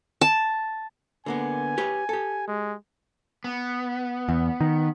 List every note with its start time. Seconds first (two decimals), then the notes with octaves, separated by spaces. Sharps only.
0.21 A5
1.26 D3 A#3 B3 G#5
1.78 G4 B4 C#5
2.09 G4 A4
2.48 G#3
3.44 B3
4.29 E2
4.61 D#3